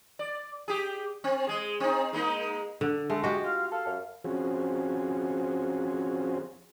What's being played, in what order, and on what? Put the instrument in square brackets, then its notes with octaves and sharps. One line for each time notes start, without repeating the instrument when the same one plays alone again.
[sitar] D5
G4 G#4
C4
G#3 G#4
C4 D#4
G#3 A#3 D#4
[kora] D3
[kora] G#3 [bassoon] A3
[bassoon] G#3 [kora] F#4 G4
[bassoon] F4 [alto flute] F5
[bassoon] A4 [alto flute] F5
[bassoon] F#2
[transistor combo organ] F3 C4 C#4 F#4 G#4